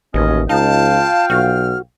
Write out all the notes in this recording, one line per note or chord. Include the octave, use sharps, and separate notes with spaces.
A1 D#2 B2 C#4 D#5
C#2 D#4 F4 F5 G5 A5
B1 F#4 F6